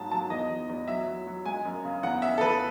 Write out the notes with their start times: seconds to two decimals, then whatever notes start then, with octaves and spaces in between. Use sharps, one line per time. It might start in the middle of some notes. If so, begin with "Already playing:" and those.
Already playing: G#2 F#3 A5
0.11 F#3 A5
0.30 E2 D#5
0.50 E2
0.69 E2
0.88 F#3 E5
1.08 F#3
1.27 F#3
1.45 G#3 G#5
1.65 F#2
1.85 C#3
2.03 E2 F#5
2.22 C#3 E5
2.38 A4
2.41 E2 B4